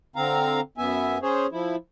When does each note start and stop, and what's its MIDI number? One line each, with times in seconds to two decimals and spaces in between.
0.16 0.60 50
0.16 0.60 60
0.16 0.60 77
0.16 0.60 82
0.78 1.18 42
0.78 1.18 59
0.78 1.18 76
0.78 1.18 80
1.22 1.46 61
1.22 1.46 68
1.22 1.46 72
1.22 1.46 73
1.52 1.76 53
1.52 1.76 64